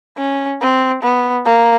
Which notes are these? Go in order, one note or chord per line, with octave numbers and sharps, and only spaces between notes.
C#4
C4
B3
A#3